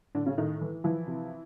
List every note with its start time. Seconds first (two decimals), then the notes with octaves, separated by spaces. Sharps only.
0.15 A2 D3 D4
0.26 C#3 C#4
0.38 A2 D#3 D#4
0.61 E3
0.84 E3 F3 E4
1.07 C3